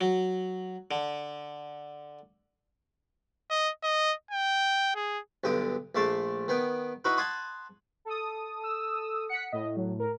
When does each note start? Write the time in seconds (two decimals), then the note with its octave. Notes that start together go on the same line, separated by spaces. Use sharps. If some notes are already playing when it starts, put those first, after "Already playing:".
0.01 F#3
0.91 D3
3.50 D#5
3.83 D#5
4.31 G5
4.95 G#4
5.44 B1 G2 D3 G5 D#6
5.95 A#1 A3 D5 A5 C6
6.48 D#3 B3 G5
7.05 D#4 E4 F#4 B4
7.17 F#5 G#5 A5 B5 C6 D#6
8.05 A4 D#6
8.64 E6
9.29 F#5 B6 C#7
9.52 A2 D#5
9.76 F#3
10.00 A#4